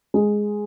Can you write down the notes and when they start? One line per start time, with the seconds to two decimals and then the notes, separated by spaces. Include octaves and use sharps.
0.14 G#3